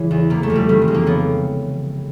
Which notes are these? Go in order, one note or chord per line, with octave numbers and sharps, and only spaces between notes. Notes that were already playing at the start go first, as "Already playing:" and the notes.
Already playing: C#3 E3 G#3 E4
E2
C3 A#3
A3
F2
G3
D#3 G3
G#3
F2
A#3
C#3 B3